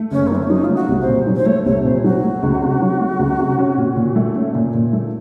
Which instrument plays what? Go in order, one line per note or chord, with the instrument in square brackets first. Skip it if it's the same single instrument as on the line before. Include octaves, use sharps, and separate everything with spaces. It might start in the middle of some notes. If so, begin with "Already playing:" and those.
Already playing: [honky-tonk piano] A3
[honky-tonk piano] F#1 [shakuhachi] C#4
[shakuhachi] A#3
[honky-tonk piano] F#2 [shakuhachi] C4
[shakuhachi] C#4
[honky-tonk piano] F#3 [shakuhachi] D#4
[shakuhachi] F4
[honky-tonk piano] A3
[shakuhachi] F#4
[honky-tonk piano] C2
[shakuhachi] C5
[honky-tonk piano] A#2
F#3
[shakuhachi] C5
[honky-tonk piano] A3 [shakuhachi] C#5
[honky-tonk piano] C2 [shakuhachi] C#5
[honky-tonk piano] A#2 [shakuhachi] C5
[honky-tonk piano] F#3 [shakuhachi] F#4
[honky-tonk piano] A3
C#2
C3
F#3
A3
C#2
C3
C#4
A#2
A#2
A3
C#4
A#2
A#2
A3